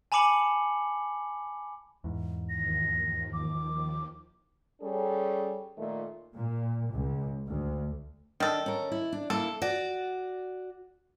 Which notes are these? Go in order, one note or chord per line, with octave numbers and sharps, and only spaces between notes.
G#5 A5 B5 D6 C#7 F#7
E2 G#2
D#2 D#3 F3 A#6
D6
G3 C#4 G#4 A4
A#2 D#3 A3
A#2
C#2
D2
D#3 D4 A4
C#4 A#4
E4
D4
A#3 E4 A4
F#4 D5